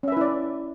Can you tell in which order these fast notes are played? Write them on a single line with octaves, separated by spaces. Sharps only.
C#4 E5 B4 E4 D5